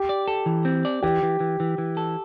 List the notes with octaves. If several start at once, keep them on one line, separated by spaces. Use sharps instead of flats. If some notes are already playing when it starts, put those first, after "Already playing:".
Already playing: G4
D5
A4
E3
C4
D5
E3 G4
E3
E3
E3
E3
A4